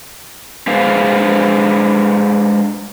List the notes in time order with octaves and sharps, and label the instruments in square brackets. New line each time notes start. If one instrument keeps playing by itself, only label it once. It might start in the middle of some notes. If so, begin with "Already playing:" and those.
[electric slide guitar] G#3 D4 G#4 B4 C5 F5